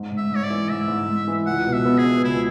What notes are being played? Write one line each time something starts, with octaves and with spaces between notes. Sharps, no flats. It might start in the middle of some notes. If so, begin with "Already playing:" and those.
Already playing: G#2
G#2
E5
G#2
C#5
D5
E3
G#2 E5
G#2
G#2
E3
C#2 F#5
B2
E5
B3
G#4
B3
C#2 E4